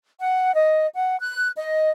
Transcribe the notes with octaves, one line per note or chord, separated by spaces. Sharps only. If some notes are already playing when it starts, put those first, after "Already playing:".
F#5
D#5
F#5
F#6
D#5